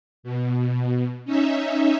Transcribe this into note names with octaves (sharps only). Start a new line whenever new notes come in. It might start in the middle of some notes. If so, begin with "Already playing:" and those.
B2
C#4 D#4 E5